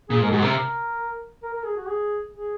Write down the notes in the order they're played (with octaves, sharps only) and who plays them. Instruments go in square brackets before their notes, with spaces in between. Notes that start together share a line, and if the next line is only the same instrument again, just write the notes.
[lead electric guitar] A#2 [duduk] G#4
[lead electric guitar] G#2 [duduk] A#4
[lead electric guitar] G#2 [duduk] F#4
[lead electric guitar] C3 [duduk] A#4
[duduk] A#4
A#4
G#4
F#4
G#4
G#4